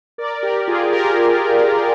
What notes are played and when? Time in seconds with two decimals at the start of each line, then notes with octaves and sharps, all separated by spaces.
0.18 A#4 D5
0.43 G4 A#4
0.68 F4 G#4
0.93 G4 A#4